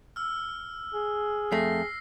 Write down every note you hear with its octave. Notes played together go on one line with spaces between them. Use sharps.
E6 F6
G#4
F2 A3 A#6 C7